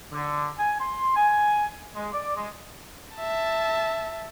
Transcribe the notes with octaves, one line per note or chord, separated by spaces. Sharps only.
D3
G#5
C6
G#5
G#3
D5
G#3
E5 A5